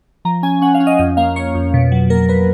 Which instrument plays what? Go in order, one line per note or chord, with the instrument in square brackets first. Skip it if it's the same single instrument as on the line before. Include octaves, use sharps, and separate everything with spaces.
[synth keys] F3 A#5
C#4 G#5
C#4 F#5
F5
C#4
D#5
F2 D#5
A#3 F5
A#3 C#5
F2
B2
F#3
A#3 A#4
A#3 B4